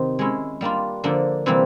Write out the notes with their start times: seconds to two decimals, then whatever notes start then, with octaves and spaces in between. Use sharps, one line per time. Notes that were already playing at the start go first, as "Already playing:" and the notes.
Already playing: C3 D#3
0.19 G#3 C#4 E4
0.61 G3 A#3 D4 F4
1.04 D3 F3 A#3 D4
1.46 C3 E3 G3 A#3